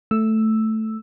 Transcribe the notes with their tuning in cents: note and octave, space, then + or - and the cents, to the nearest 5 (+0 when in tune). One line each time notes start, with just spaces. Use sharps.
A3 +0 E6 +0